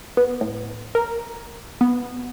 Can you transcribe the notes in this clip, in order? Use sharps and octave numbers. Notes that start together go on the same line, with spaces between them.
B3
A2
A#4
B3